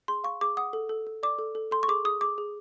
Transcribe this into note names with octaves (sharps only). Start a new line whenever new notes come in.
G#4 C6
F5 C#6
G#4 D6
F#5 D#6
A4
A4
A4
D5 D6
A4
A4
A4 C6
C#6
G#4 D6
G#4 D#6
G#4 D6
G#4